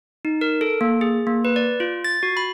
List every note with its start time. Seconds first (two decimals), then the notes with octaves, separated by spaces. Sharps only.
0.25 D#4
0.41 A#4
0.61 A4
0.81 A#3
1.01 G#4
1.27 A#3
1.45 B4
1.56 D5
1.80 F4
2.04 A6
2.23 F#4
2.37 B5